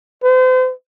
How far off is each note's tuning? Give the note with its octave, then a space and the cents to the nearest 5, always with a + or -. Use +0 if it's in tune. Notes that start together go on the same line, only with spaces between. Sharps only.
C5 -40